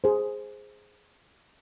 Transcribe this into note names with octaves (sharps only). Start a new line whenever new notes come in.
G#4 C5